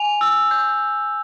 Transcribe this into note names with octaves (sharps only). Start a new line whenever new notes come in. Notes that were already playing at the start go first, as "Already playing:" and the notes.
Already playing: G#5 F7
E6
G6